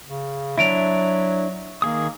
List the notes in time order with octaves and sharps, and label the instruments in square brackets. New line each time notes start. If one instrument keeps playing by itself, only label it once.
[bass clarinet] C#3
[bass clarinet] F#3 [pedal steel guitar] D4 E4 [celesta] E5 D7 F7
[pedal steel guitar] D#3 G#4 D#6 [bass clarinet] A#3